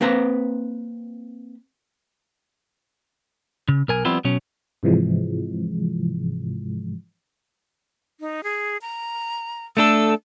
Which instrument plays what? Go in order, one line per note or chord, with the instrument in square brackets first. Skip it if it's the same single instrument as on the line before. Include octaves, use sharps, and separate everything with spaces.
[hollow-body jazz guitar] A#3 C4 B4 A#5
[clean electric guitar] C#3
B1 A#4 G#5
F3 G3 B3 C4 E4 F4
B2 F#3 C#4
[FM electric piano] G#2 C3 E3 F3 G#3
[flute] D#4
G#4
A#5
[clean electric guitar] A3 D4 A4 [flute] E6